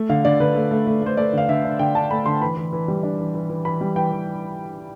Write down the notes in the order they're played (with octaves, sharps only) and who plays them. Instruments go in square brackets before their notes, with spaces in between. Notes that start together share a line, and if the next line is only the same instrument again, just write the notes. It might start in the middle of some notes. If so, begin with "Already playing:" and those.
Already playing: [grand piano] A3
D3 F5
D3 D5
D3 B4
A3
A3
A3
A3 C5
A3 D5
D3 F5
D3 E5
D4
D3 G5
D4 A5
A3 B5
D3 C6
E3 B5
E3
E3
G3
D4
E3
E3
E3
E3 B5
G3
E3 G5
E3